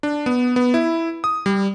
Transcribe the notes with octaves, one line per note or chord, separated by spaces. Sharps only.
D4
B3
B3
E4
D#6
G3